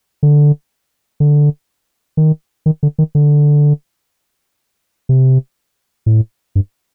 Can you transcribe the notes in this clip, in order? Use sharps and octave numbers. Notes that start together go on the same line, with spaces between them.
D3
D3
D#3
D#3
D3
D#3
D3
C3
A2
G2